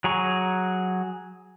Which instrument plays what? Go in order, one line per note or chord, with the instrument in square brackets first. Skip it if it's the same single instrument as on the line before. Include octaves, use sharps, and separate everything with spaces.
[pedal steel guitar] F#3 G#4 A#5 C#6